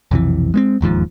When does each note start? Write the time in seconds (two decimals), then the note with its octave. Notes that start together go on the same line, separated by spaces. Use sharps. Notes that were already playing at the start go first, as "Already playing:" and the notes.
0.11 B1 F2 C3 E3
0.54 G#3 A#3 C4
0.81 E1 D#2 G#2 F3